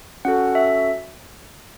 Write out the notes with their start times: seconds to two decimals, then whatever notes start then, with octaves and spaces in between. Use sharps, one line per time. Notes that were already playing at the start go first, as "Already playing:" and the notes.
0.25 C#4 F#4 A4 F#5
0.55 E5